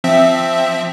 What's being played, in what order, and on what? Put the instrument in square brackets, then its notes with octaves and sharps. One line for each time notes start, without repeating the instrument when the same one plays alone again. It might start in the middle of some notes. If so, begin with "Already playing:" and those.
[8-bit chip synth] F3 C4 E5